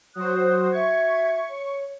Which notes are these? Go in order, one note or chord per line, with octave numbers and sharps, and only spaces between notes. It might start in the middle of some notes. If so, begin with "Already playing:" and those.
F#3 F#4 C5 D#6 F#6
F#4 E5 C#6 G#6
C#5